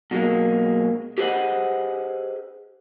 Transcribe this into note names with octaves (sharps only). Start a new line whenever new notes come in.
B2 F#3 G#3 A#3
G4 G#4 B4 C5 D#5 F#5